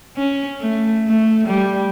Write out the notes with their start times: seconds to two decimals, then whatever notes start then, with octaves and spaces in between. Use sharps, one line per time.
0.17 C#4
0.61 A3
1.08 A3
1.47 G3